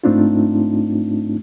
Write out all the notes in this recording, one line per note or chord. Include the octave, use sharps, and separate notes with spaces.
G#2 A3 C4 D4 D#4 F4